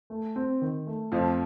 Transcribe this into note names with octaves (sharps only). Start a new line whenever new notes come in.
A3
C4
D#3
A3
F2 F3 A3